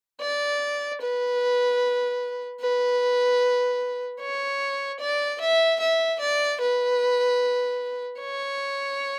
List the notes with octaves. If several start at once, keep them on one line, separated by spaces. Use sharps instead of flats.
D5
B4
B4
C#5
D5
E5
E5
D5
B4
C#5